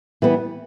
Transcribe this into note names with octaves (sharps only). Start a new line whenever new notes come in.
E3 G3 B3